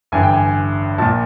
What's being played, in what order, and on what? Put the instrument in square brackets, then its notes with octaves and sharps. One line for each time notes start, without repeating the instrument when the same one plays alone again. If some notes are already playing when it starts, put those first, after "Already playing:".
[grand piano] A1 G2 D3 G#5
G5
G#5
A#1 A#2 A5